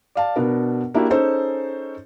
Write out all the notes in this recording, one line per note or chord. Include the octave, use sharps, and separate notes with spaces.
D5 F5 A5
B2 B3 D4 A#4
A#3 D4 E4 F#4 G4
C#4 D#4 G#4 A4 C5